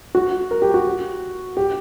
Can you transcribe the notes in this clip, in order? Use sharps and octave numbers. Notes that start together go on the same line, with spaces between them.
F#4
A#4
G4
F#4
G4